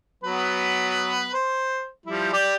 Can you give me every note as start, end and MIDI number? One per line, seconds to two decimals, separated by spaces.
0.24 1.32 54
0.24 1.32 59
0.24 1.32 71
1.34 1.87 72
2.06 2.33 53
2.06 2.33 55
2.06 2.33 64
2.33 2.55 67
2.33 2.55 74